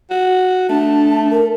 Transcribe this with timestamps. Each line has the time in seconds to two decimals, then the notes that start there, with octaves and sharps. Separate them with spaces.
0.10 F#4
0.69 A3 D4 A5
1.31 A#4